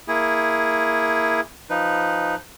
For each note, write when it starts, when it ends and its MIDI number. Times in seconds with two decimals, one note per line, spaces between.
0.08 1.41 58
0.08 1.41 64
0.08 1.41 68
1.70 2.35 53
1.70 2.35 63
1.70 2.35 71